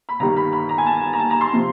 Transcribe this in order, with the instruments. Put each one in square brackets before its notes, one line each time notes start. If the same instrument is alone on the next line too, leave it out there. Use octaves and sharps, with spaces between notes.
[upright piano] B5
G1 G2 D#3 G3 A#5
B5
B5
A#5
G#5
A5
A#5
A5
A#5
C6
C3 F3